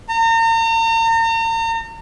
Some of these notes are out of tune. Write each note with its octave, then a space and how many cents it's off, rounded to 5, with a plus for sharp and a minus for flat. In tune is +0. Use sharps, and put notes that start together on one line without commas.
A#5 -40